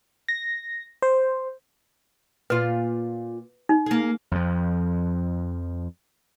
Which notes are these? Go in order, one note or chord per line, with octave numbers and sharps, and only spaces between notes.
A#6
C5
A#2 F4 B4
D#4
A#3 G#4
F2 F3